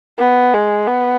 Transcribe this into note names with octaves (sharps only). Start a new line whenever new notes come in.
B3
G#3
B3